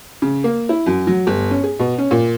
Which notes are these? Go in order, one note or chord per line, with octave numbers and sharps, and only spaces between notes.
C#3
A#3
E4
F#2
F#3
G1
C#4
G#4
B2
C#4
A#2